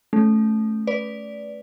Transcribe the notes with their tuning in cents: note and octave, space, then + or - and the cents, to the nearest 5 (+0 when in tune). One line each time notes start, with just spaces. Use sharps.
A3 -15 C#4 +0
B4 +0 D5 -15